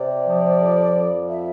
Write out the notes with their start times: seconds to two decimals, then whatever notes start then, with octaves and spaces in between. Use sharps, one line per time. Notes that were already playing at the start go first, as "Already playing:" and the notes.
Already playing: C3 D5
0.26 F3
0.60 F2
0.95 F2
1.29 F3 E5